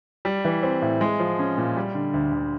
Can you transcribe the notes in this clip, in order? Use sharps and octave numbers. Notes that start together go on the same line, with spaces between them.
G3
E3
C4
A2
G#3
F3
C#4
A#2
G3
D3
D2
D2